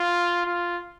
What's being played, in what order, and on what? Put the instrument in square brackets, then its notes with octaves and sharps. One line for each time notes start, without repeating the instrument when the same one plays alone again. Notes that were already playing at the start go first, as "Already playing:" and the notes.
Already playing: [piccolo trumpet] F4
F4